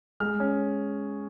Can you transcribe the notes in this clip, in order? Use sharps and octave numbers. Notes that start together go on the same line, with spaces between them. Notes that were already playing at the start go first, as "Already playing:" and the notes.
G#3 F6
C#4